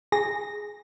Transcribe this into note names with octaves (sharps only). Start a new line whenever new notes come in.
G#4 A#6